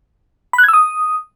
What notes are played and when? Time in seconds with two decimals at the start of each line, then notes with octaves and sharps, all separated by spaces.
0.53 B5
0.58 F#6
0.63 G#6
0.68 E6
0.73 D#6